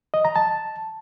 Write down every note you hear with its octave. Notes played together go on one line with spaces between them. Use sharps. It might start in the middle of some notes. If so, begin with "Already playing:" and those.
D#5
A#5
A5